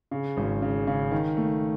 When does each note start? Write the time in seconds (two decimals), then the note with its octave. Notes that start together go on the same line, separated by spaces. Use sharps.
0.11 C#3
0.37 G#1
0.62 C#3
0.87 C#3
1.11 D#3
1.37 A3